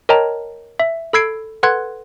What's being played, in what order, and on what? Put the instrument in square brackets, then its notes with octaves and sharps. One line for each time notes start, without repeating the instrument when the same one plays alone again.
[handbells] A#4 C#5 D#5 G5 A5 A#5
E5
A4 B5 E6 G#6 C7 D7
A4 B4 F#5 C6 F#6 G#6